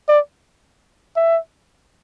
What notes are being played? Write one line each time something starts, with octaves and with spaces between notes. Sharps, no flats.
D5
E5